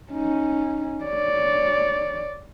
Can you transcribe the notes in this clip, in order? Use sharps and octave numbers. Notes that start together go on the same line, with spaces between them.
C#4 D#4
C#5 D5